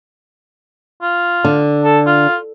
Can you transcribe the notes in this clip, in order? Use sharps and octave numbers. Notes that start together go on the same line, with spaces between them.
F4
D3
A4
F4